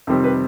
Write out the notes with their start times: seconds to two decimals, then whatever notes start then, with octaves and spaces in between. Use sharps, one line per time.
0.07 F2 C3 D#3 G3 C4
0.24 B4